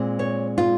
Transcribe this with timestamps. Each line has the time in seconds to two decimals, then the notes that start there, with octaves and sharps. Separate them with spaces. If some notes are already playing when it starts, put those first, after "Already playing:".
Already playing: A#2 G#3 C4
0.19 C#5
0.58 F4